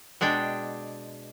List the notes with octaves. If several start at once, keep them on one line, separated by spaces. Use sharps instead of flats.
B2 G#3 D4 G5